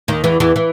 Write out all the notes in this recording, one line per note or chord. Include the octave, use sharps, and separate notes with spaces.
D#2 D#3
E2 E3
E2 E3
E3